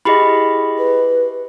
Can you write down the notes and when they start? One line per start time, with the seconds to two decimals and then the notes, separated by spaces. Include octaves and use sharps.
0.05 E4 G4 G#4 D#5 B5
0.78 B4